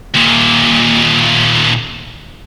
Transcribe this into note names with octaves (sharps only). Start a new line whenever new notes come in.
D#2 A#2